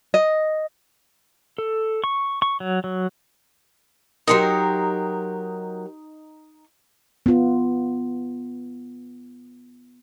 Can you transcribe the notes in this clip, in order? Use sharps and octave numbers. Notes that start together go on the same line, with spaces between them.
D#5
A4
C#6
C#6
F#3
F#3
F#3 D#4 G4 A#4 C6
B3 F4